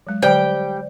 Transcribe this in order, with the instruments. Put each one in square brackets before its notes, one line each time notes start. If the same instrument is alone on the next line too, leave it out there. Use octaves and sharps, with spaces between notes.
[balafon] F#3 G#3
[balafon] D3 F#3 [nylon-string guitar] G3 [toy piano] C5 [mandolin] G5